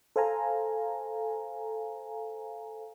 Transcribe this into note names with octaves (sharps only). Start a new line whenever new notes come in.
A4 C5 F5 G#5 A#5